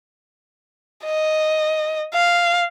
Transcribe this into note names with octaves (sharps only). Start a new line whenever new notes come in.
D#5
F5